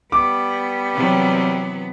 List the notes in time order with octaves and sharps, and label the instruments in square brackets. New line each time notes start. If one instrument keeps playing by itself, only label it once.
[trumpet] G3 [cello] B3 [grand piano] D6
[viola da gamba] C3 E3 F#3